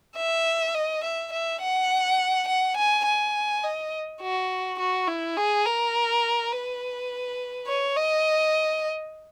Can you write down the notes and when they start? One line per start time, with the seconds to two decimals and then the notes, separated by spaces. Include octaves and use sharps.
0.17 E5
0.74 D#5
1.04 E5
1.32 E5
1.61 F#5
2.48 F#5
2.77 G#5
3.06 G#5
3.63 D#5
4.21 F#4
4.79 F#4
5.07 E4
5.37 G#4
5.65 A#4
6.52 B4
7.67 C#5
7.96 D#5